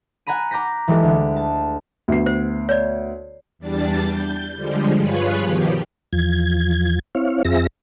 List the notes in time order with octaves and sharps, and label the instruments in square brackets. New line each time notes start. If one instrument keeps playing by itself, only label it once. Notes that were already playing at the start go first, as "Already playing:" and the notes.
[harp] F#5 G#5 A#5 B5 D#7
A#5 D6 G6 A#6 B6
E3 G#3 G4 A4
D2
A5
[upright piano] D2 B3 C7
[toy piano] C5
C#5 D5
[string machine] E2 G3 D4 A6
G6
D3 F3 G3 G#3
G2 F4 G#4 B4 C#5 F#6
B2 D#3 F3 G4
[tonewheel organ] E2 F3 G#6
C4 E4 C#5 F5
F2 C4 F4 G#4 E5 A#6